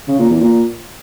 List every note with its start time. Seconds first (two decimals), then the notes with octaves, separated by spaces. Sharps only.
0.08 C#3
0.19 A#2
0.30 E2
0.41 A#2